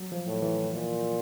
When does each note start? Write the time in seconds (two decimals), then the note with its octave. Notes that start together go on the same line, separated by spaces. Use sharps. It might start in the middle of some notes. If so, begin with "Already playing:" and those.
Already playing: F#3
0.12 F3
0.26 A2
0.42 E3
0.73 A#2